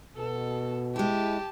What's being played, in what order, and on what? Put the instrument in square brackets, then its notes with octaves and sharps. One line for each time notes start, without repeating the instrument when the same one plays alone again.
[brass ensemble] B2 [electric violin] A4
[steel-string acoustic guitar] G#3 E4 [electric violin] G4 A5